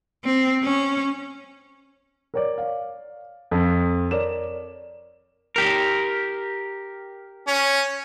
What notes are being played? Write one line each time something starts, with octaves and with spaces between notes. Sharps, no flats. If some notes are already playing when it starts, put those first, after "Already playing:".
C4
C#4
A#4 C#5 D5
F5
F2
A#4 C#5 D5 E7
G4 A#4
C#4